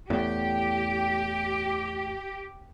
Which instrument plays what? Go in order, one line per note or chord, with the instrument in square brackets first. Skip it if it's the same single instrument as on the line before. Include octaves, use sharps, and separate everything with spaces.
[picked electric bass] E2 A2 [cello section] G4